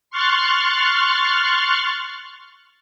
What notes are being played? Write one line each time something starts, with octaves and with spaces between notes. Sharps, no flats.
C6 C#6 F6 F#6 A6